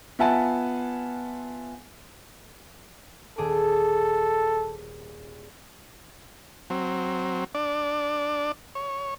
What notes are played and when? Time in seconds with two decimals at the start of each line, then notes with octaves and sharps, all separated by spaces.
0.19 B3 F4 E5 F#5 G#5 A5
3.38 D#1 G#4 A4 D6
6.70 F#3 C4
7.55 D4 D5
8.75 C#5